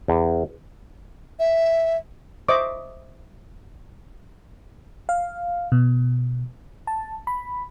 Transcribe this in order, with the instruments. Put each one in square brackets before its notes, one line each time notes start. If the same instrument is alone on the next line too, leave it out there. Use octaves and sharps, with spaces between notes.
[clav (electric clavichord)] E2
[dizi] E5
[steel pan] C5 D#5 E5 C#6 D6
[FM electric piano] F5
B2
A5
B5